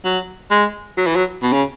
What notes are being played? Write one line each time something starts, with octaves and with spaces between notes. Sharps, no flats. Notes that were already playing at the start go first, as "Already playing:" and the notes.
F#3
G#3
F#3
E3
F#3
B2
C#3